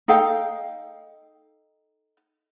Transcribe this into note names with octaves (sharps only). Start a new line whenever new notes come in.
D#4 A4 F5 G5